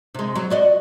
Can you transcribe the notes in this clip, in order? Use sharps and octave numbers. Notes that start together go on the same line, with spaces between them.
C3 G#3
F#3
F#4 D5 D#5